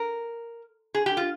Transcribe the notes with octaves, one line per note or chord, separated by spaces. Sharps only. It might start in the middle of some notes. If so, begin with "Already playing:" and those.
Already playing: A#4
G#4
G4
F4